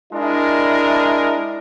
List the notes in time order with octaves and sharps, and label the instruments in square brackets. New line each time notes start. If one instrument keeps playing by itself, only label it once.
[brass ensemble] G#3 D4 E4 A#4